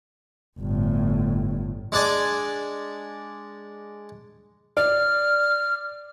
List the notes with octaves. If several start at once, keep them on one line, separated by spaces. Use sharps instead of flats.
G1 A2
G#3 D4 D5 G#5
D5 F6